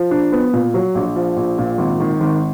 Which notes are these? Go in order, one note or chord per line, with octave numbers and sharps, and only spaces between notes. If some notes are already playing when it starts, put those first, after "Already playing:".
Already playing: F3
D4
B3
A#2
F#3
A#1
F3
A#1
A#2
G#1
D#3
G#1